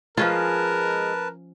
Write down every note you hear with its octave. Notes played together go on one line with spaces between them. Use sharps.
F3 G#3 C#4 F4 A#4 B4 A5